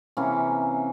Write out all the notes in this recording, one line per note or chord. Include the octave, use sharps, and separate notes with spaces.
C3 E3 A#3 C#4